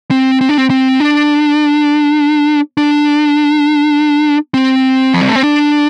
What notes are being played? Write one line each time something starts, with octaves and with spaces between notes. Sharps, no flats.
C4
C4
D4
C4
C4
D4
D4
C4
F3
G3
A3
C4
D4